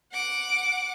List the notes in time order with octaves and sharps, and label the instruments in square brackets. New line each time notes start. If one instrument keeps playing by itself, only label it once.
[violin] F#5 D6